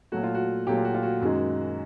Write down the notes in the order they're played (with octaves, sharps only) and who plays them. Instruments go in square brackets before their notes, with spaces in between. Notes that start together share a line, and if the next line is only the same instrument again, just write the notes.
[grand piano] A#2 F#3 A3 F#4
F4
F#4
A#2 F#3 A3 G4
F4
F#4
F4
F#4
F#2 D#3 G#3